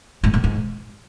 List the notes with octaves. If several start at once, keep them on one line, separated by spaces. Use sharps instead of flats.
G#2
A2
G#2